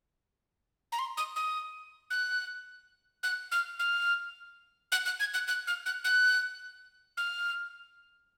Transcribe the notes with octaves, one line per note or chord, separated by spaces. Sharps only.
A#5
C6
D#6
D#6
F#6
F#6
F6
F6
F#6
F#6
G#6
F#6
F#6
F6
F#6
F#6
F6